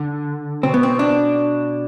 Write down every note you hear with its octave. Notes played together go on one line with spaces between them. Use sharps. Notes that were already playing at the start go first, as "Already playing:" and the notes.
Already playing: D3
B2 C4
B3
C4
D4